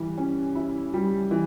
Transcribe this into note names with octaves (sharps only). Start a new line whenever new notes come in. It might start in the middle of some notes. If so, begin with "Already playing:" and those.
Already playing: E3 G3
C#4
E4
G3
E3